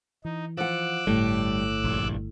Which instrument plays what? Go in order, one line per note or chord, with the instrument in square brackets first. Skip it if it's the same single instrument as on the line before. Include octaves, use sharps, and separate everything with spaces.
[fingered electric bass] E3 [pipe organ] D#4
[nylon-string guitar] F3 F#5 [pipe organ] D6 E6 F#6
[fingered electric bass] G1 A3 [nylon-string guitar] A2 [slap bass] G3
[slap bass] A#1 G2